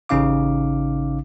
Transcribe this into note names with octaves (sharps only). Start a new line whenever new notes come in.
A1 C#3 C#4 D#4 F5 D6